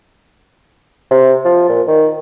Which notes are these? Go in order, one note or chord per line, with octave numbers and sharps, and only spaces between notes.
C3
F3
A#2
D#3